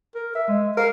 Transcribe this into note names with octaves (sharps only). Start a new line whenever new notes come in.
A#4
E5
G#3
A#4 F5